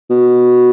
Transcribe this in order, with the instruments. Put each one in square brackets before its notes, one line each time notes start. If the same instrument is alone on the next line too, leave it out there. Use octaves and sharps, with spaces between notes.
[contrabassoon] B2